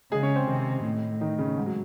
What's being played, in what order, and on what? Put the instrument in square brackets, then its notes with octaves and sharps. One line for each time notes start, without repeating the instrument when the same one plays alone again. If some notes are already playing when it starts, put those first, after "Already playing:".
[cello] C#3 [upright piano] G#3 G#4
[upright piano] C#4 C#5
C4 C5
[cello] C3 [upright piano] D#3 D#4
[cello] A2
[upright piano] D#3 D#4
C#3 C#4
G#2 G#3
F#3